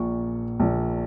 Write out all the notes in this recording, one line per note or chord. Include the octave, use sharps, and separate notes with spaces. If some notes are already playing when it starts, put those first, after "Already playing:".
Already playing: A#1 A#2 C#6
A#1 A#2